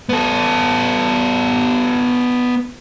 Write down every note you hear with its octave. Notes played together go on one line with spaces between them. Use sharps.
B3 A4